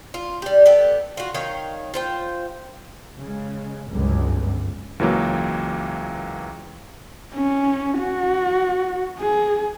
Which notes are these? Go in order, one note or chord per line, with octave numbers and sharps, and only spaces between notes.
F4
G3 G4
B3 G4 A4
F4 F#4
D#3 C#5 F5 G5
F4 C5 G5
C#3 G#3
G1 C#2 F#2
C#2 E3 F#3 A#3
C#4
F#4
G#4